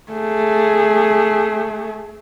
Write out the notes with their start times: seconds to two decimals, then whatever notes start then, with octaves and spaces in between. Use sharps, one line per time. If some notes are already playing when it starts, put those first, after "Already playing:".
0.12 A3 G#4